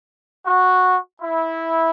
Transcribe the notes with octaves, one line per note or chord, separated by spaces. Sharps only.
F#4
E4